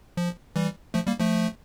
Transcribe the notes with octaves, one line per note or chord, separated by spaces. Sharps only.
F3
E3 G3
F3 A3
G3 A#3
F3 A3